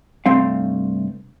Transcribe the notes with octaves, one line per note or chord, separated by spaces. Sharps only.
G2 C3 A3 C4 F5